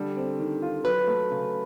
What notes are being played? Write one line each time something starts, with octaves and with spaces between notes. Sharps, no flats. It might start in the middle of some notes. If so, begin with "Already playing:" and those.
Already playing: D3 G3 A4
C4
D#3
F4
F#3 B4
A3
C#3